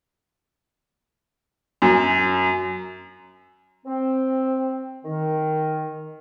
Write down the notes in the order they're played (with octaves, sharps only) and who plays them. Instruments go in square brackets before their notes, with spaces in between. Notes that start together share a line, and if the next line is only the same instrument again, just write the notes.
[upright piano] F#2
[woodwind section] C4
D#3